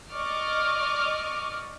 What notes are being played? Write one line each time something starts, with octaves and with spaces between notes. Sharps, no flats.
D5 D#5 C#6 D6 F6